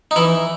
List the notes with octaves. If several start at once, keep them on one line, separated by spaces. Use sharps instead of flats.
D#4
E3 E4